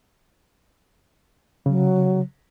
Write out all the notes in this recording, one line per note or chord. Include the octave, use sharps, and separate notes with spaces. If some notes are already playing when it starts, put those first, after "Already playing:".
C#3 F#3